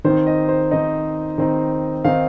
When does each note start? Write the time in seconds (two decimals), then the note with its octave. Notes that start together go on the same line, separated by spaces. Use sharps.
0.04 D#3 C4 D#4 C5
0.27 D#5
0.48 C5
0.71 D#3 C4 D#4 D#5
1.38 D#3 C4 D#4
2.04 D#3 C4 D#4 F5